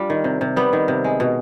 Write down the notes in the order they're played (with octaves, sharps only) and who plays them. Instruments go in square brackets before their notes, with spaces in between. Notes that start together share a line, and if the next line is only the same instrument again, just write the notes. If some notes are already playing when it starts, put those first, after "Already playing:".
Already playing: [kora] G3 D4 F4
D#3
C3
C3
G3 B3
D#3
C3
G#3
B2